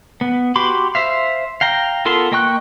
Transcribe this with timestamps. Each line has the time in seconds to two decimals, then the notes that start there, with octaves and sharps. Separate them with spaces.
0.21 B3
0.55 F#4 G4 B5 C6 D6
0.95 C5 E5 F5
1.61 F5 G5 A#5
2.05 B3 F4 A4 A#4 C6
2.32 A#3 D#5 G5 C#6 F#6